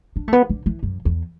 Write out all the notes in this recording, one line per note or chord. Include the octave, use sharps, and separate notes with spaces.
D4
A3
B3
D3
E3
F#2
E2